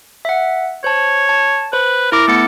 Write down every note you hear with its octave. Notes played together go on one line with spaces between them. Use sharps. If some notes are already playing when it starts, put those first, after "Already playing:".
E5 F#5
C5 C#5 A5
A5
B4 C5
E4 A#4 D6 A#6
A3 B3 A4 C#7